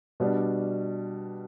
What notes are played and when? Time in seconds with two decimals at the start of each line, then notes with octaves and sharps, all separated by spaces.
0.20 B2 G3 D4